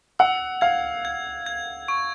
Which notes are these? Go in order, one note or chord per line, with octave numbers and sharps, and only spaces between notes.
F#5 E6
F5 G#6
G#6
G#6
C#6